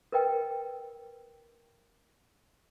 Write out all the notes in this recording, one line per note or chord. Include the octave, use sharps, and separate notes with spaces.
A#4 B4 D#5 G5